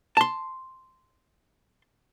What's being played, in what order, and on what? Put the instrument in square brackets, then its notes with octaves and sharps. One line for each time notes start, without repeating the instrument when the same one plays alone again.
[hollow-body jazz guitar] A5 C6